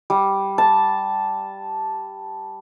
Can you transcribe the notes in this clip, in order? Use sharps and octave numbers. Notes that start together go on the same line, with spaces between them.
G3
A5